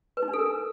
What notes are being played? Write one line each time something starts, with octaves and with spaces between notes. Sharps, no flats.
B4
D#4
D4
A4
A#4